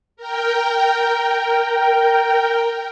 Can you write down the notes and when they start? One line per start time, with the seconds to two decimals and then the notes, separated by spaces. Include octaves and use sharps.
0.17 A#4 G5